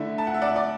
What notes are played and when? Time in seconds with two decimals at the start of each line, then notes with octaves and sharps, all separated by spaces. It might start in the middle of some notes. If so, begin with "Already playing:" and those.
Already playing: D3 A3 E4 E5
0.18 A5
0.27 F#5
0.34 E5
0.41 D5 F#5
0.56 D5